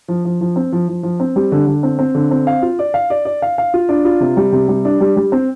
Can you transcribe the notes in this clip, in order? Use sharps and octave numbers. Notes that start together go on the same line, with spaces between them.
F3
F3
F3
C4
F3
F3
F3
C4
G3
D3
D3
C4
C4
D3
C4
F5
F4
D5
F5
D5
D5
F5
F5
F4
D4
F4
C3
G3
C3
G3
D4
G3
G3
C4